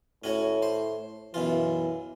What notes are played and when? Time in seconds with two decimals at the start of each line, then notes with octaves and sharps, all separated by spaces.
0.24 A2 C#4 F#4 C#5
0.62 C5
1.34 F#2 B2 E3 F4